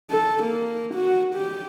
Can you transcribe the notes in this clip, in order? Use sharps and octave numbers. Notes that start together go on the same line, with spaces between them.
A4
A#3
F#4
G4